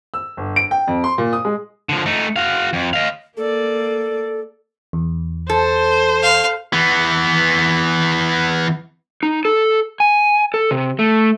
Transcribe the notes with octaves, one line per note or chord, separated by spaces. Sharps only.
E6
G1
D7
G5
F2
C6
A#2
D#6
G#3
D3 F3
A3 D#4
F#4 F5
F2
D#5 F5
A#3 A4 D5
E2
A4 C5
F5
E3 B3
D#4
A4
G#5
A4
C3
A3